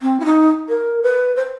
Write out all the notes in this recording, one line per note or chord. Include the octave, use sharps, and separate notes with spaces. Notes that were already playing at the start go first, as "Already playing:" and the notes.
C4
E4
D#4
A#4
B4
C5